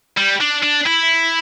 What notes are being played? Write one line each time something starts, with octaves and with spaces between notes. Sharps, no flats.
G3
D4
D4
E4